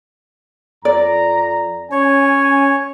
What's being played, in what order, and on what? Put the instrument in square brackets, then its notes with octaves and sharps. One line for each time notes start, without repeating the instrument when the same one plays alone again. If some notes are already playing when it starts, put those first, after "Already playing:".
[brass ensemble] F2 A#5 [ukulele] D5
[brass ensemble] C#4 G#5 [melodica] C#5